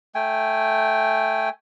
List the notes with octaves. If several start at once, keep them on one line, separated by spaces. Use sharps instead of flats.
A3 G5 G#5